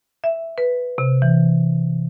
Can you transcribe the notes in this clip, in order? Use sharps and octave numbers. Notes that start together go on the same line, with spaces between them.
E5
B4
C3
E3